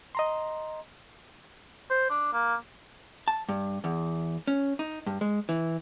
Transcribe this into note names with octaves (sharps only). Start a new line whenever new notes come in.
D#5 A#5 C6
C5
D4
A#3
A5
G2
E2
C#4
D#4
G2
G#3
E3